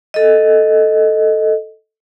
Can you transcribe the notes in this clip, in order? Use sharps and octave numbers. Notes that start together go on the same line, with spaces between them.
A4 D#5